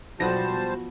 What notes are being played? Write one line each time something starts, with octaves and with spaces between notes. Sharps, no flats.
B1 F3 G3 B3 F#4 C5 A5 A#6